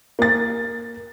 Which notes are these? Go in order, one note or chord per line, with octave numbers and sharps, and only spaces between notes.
A#3 A6